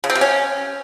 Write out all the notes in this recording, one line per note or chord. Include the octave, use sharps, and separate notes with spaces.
C#3
C4
C3
C#4